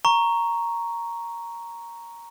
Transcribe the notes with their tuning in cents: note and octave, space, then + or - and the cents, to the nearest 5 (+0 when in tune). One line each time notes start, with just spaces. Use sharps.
A#5 +0 C#6 +0